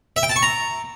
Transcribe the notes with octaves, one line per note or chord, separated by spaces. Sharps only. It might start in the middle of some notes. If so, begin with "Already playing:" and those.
E5
G5
A5
C#6
A#5